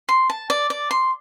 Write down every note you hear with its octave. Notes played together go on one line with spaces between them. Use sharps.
C6
A5
D5
D5
C6